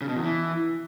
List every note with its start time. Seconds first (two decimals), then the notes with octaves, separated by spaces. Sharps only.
0.01 C#3
0.09 B2
0.16 E2
0.23 E3